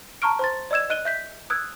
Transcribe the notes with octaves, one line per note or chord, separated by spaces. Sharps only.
A5 A#5 C#6 F6 D7
C5 C6 A6
D5 D#5 E6 G#6 E7
D#5 F#6 D#7 G7
E5 G6 B6
D#6 E6 F#6 G#6